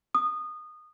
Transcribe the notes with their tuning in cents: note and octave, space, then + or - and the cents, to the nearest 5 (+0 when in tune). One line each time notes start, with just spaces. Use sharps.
D#6 -20